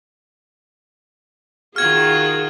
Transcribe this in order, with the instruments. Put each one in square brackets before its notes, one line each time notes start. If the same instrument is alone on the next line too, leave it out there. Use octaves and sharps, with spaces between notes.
[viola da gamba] D#3 F4 F#4 [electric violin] G#4 [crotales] F6 G#6